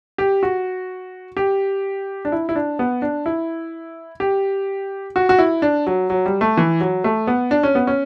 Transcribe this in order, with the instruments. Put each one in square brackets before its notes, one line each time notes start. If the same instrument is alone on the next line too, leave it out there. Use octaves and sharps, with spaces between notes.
[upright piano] G4
F#4
G4
D4
E4
E4
D4
B3
D4
E4
G4
F#4
F#4
E4
D4
F#3
F#3
G3
A3
E3
F#3
A3
B3
D4
C#4
B3
C#4